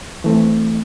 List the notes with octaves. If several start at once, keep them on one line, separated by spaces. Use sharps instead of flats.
E3 A3 C4